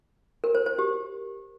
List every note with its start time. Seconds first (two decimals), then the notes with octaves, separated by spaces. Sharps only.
0.44 A#4
0.55 C5
0.66 C5
0.79 G4